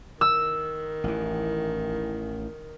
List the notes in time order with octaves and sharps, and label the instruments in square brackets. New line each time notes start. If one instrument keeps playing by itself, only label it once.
[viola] D#3 [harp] E6
[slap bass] A1 E3